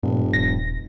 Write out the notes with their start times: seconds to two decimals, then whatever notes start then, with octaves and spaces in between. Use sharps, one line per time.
0.03 F1 G2 A#2
0.33 D#1 A#6